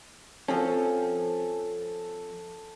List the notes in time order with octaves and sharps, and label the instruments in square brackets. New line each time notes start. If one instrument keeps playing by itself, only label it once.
[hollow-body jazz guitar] F3 C4 C#4 [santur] A4